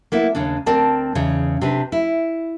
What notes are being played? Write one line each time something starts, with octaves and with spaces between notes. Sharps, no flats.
A#3 B3 E4
D#2 C#3 C#4 D4
D2 C4 A#4 D5 A5
E2 C#3 D#4
C3 C4 D4 B4
E4